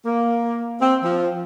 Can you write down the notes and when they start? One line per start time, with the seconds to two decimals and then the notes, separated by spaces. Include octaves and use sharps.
0.06 A#3
0.81 C4
1.04 F3